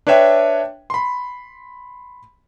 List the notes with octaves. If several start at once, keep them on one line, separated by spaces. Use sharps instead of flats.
D4 B4 C#5 E5 G5
B5 C6